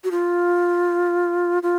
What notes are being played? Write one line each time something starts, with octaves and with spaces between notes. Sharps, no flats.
F#4
F4
F4